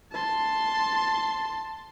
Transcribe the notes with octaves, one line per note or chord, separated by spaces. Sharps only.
A5 C6